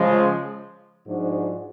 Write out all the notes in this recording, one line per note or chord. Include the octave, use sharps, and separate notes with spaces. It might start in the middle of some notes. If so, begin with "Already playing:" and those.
Already playing: C#3 F3 G#3
G#2 F3 G#3 D4 F#4